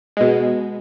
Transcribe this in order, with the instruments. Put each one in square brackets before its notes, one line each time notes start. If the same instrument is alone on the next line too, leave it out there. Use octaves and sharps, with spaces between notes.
[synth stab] B2 G#3